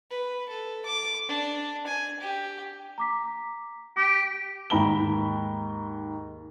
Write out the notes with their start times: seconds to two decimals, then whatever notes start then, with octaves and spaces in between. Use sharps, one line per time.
0.11 B4
0.50 A4
0.86 D6
1.29 D4
1.87 G#5
2.21 G4
2.98 A#5 D6 B6
3.97 G4 D6
4.70 D#2 G#2 D#4 A#5 B5 G7